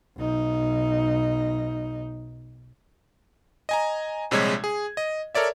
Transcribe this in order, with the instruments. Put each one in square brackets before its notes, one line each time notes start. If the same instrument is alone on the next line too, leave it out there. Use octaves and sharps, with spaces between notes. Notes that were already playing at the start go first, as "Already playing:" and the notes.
[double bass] B1 D#4
[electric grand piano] D#5 G#5 A#5
A#1 C3 G3 G#3 C#5 G#6
G#4
D#5
A4 A#4 C#5 D5 E5